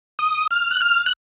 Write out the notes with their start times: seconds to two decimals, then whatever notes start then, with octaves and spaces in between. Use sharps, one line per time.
0.19 D#6
0.51 F6
0.71 F#6
0.81 F6
1.06 F#6